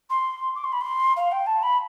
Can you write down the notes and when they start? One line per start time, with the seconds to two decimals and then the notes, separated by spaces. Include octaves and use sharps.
0.10 C6
0.55 D6
0.64 C6
0.72 B5
0.81 C6
1.16 F5
1.31 G5
1.46 A5
1.62 B5